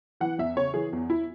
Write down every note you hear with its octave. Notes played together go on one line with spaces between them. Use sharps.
E3 F#5
E2 E5
C#3 C#5
E3 G#4
E2
E4